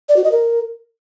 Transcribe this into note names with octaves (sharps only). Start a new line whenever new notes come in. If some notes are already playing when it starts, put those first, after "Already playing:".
D5
F#4
D#5
A#4